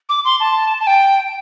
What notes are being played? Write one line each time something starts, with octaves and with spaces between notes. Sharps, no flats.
D6
C6
A5
A5
G5